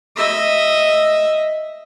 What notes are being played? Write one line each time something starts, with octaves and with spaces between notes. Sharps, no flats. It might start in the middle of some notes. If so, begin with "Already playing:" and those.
D#5 E5